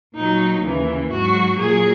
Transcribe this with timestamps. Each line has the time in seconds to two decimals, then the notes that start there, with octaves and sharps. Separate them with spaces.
0.15 A#2 F#3 D#4
0.63 D#2 C#3 E3
1.10 G#2 F#3 F#4
1.59 A#2 F#3 G#4